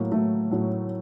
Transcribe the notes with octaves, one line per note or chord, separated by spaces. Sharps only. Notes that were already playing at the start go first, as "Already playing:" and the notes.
Already playing: A2 F#3 A#3
A2 F#3 A3
A2 F#3